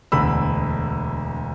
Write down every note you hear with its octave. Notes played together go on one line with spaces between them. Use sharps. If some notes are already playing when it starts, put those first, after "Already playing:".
E1 D2 D3 B5 E6